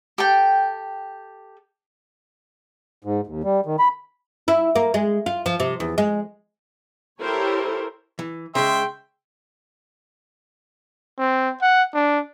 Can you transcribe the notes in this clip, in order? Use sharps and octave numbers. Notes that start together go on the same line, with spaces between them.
G4 A4 G5
G#2
D#2
G3
D#3
B5
E4
A#3
G#3
F4
F3
C3
E2
G#3
E4 G4 A4 A#4 C5 C#5
E3
C#3 G#3 E5 G5 C6
C4
F#5
D4